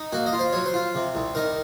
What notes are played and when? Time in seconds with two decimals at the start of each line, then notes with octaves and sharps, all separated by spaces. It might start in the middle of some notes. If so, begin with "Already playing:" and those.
Already playing: D#4
0.12 A#3 F#4
0.26 D#5
0.33 F4
0.39 C5
0.52 F#3 C#5
0.66 C5
0.74 F4
0.95 C3
1.15 C2
1.35 D#3 A#4